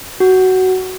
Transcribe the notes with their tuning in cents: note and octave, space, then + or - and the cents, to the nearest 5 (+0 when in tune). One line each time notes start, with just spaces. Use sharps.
F#4 +15